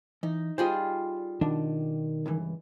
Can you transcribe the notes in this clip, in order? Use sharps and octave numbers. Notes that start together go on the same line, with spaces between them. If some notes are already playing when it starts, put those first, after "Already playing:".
E3 D#4
G3 F4 G#4 C5 D5 D#5
B2 D#3 D4
C#2 G2 E3